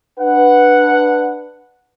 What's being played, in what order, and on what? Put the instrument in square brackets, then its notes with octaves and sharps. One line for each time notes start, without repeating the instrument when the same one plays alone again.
[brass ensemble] D4 B4 F#5